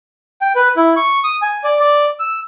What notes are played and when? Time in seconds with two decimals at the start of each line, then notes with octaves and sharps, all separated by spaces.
0.41 G5
0.55 B4
0.77 E4
0.96 C#6
1.24 D#6
1.42 G#5
1.64 D5
1.80 D5
2.19 E6